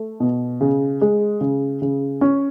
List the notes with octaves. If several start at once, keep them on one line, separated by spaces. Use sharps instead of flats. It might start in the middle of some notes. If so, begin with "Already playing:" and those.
Already playing: A3
B2
C#3
G#3
C#3
C#3
C#4